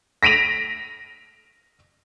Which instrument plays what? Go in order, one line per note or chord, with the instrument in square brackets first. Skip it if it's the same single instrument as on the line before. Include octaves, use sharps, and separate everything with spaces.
[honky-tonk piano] A#6 B6 D7 D#7 F7